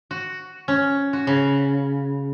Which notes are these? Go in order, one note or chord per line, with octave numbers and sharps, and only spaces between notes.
F#4
C#4
F#4
C#3